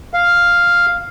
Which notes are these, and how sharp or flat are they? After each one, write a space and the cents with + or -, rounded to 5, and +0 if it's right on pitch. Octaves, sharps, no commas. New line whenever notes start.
F5 +0